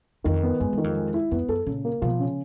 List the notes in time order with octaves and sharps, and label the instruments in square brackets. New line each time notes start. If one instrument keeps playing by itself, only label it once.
[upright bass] F2 [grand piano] D#3
[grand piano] B3
[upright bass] F#2 [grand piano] G#3
[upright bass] F#2 [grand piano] D#3
[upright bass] F2
[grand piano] G#3
E4
[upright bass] F2 [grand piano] B3
[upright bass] F#2 [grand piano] A4
[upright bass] A#2 [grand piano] C#3
[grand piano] A#3
[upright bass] B2 [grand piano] F3
[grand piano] C#3